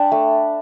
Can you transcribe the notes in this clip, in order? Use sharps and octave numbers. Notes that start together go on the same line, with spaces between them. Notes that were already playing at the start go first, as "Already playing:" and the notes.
Already playing: D4 G5 A5 B5
A3